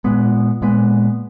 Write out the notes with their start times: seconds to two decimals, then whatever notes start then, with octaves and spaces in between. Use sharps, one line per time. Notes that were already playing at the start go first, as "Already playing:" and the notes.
0.04 A#2 G#3 B3
0.62 A#2 G#3 B3